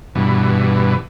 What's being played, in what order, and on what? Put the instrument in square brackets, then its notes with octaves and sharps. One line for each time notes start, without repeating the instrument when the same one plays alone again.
[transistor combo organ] G2 B2 E3